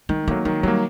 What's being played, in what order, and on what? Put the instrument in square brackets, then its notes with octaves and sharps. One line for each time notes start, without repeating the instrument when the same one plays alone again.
[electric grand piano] D#3 [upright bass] G#3
[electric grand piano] F#3 A#3 [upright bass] A3
[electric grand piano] D#3 [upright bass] G#3
[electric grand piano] F#3 A#3 [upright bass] G3